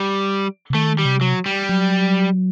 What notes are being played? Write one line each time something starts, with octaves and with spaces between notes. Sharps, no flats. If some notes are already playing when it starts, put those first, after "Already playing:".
Already playing: G3
C3
D#3 A3
G3
C3
F#3
G3
F#3